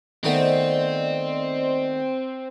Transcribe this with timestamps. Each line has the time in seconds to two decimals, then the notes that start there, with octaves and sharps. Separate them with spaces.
0.24 D#3 A3 B3 C4 C5 D5 D#5